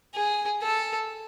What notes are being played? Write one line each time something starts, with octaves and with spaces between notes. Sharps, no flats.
G#4
A4